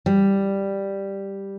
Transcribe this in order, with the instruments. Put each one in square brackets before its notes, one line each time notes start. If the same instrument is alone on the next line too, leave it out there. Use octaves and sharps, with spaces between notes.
[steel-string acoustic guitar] G3